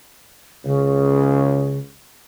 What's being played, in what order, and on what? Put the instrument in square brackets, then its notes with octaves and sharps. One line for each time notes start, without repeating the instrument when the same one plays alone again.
[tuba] C#2 [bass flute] C#3